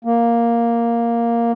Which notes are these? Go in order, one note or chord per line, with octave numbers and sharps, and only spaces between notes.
A#3